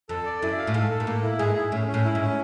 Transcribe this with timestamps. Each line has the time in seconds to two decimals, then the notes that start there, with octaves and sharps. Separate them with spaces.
0.09 F2 A4
0.25 D5
0.42 F#2 E4
0.58 F5
0.67 A2
0.74 G#2 A4
0.90 A4
1.00 A#2
1.07 A2 A#3
1.23 E4
1.39 G#2 G#4
1.56 E4
1.72 A2 C#4
1.88 C#4
1.94 A2
2.05 E4
2.15 G#2
2.21 C#4